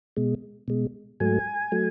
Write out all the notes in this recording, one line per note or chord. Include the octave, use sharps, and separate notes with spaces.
B2 G#3
B2 G#3
G#2 F#3 A3 G#5
F#3 A3